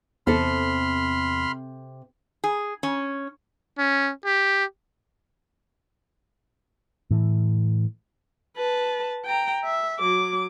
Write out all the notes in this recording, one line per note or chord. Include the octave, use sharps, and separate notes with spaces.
E2 C3 C4 A4 B5 C6 F6
G#4
C#4
C#4
G4
A2 E3
B4 A5
G5 A#5
E5
F#3 D6